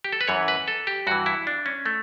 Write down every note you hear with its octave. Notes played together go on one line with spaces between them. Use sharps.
G4
A4
B4
F#2 E3 C#5
B4
A4
G4
G2 E3 F#4
E4
D4
C#4
A3